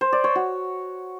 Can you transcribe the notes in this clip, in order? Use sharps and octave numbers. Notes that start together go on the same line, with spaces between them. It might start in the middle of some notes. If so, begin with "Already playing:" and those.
C5
D5
C#5
F#4